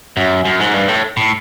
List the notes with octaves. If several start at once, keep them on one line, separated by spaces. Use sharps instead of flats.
F#2
F#2
G#2
G2
A2
A2